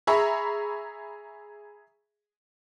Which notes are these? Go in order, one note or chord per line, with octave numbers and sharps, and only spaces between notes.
G#4 E5 A#5 B5 C#6